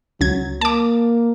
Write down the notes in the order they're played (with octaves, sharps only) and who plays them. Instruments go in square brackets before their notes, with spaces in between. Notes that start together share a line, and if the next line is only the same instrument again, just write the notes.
[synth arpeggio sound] C#2 G#6 [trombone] F#3
[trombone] A#3 [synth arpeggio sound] A5 D6